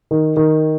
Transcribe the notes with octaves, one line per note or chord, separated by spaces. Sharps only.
D#3
D#3